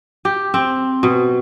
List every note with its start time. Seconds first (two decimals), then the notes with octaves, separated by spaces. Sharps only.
0.25 G4
0.54 C4
1.03 B2